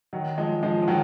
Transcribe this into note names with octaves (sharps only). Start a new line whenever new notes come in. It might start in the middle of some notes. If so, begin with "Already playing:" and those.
D#3 F#3
F3 G#3
F3 G#3
F3
D#3 F#3